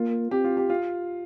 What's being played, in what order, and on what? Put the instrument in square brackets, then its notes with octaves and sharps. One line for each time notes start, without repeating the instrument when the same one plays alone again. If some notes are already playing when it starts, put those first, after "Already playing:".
Already playing: [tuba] A#3 [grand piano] F4
[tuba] C4 [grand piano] G4
[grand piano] F4
G4
F4